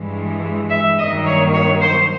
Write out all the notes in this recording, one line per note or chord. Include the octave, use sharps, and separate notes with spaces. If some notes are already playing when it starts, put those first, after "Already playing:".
Already playing: G2 E3 G#3
E5
G2 D#3 F#3 A#3 D#5
C#5
C#5
C5